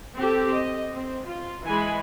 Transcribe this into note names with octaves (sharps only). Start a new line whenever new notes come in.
C4 G4 A4
D#5
C4
F4
E3 G#3 G#5 B5